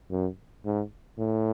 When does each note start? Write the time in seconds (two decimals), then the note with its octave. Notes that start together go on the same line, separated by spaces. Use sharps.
0.11 F#2
0.65 G#2
1.18 A2